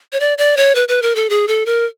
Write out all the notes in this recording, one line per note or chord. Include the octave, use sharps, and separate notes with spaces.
C#5
D5
D5
C#5
B4
B4
A#4
A4
G#4
A4
A#4